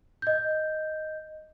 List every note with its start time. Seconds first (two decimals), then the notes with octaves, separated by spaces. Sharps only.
0.22 D#5 G6